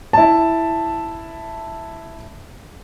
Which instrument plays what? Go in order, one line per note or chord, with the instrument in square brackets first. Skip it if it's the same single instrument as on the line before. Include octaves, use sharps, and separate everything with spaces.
[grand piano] E4 A5